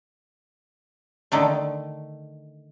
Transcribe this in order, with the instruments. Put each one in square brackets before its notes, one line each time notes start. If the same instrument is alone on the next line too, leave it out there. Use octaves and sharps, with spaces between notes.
[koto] D3 D#3 A3